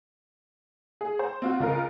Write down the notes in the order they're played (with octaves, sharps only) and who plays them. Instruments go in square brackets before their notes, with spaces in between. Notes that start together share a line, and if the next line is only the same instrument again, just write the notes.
[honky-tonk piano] G#4
C5
C4 F4 F#4
C#2 F4 A#4